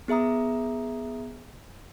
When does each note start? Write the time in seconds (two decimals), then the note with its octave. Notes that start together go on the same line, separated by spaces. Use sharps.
0.08 B3 G#4 E5 A#5 D#6